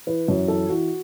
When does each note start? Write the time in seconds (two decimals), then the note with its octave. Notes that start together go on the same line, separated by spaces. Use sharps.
0.07 E3 B4
0.28 F#2
0.48 E3 A4
0.69 E3 F#4